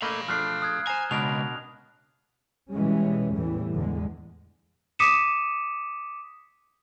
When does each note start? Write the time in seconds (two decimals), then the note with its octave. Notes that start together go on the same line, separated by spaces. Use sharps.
0.02 A3 A#3 D#5 F5 B5
0.28 F3 A3 D4 F6 F#6 C7
0.62 D#6 F#6 G#6
0.87 C5 G#5 A#5
1.11 C#2 B2 D4 A#4 F7
2.73 B2 E3 G3 G#3 C#4
3.32 E2 A2 E3 G3
3.74 E2 D3 G#3
4.99 D6 D#6 B6 C#7 D#7 E7